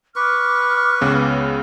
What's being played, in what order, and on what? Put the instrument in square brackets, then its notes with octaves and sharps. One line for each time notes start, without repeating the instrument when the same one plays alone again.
[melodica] B4 C#6 [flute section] D6 F6
[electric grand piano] C#2 C#3 B3